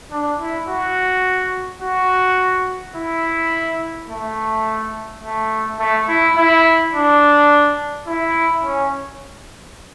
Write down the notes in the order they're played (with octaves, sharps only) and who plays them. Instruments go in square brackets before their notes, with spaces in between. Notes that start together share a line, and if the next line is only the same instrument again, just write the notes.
[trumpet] D4
E4
F#4
F#4
E4
A3
A3
A3
E4
E4
D4
E4
C#4